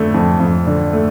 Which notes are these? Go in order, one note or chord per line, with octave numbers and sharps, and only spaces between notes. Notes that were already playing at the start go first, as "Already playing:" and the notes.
Already playing: F2 D3 A3
F2
F2
D3
A3